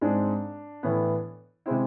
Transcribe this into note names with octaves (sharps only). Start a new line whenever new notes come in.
G#2 G#3 C4 D4
A2 E3 B3
C3 G#3 C4 E4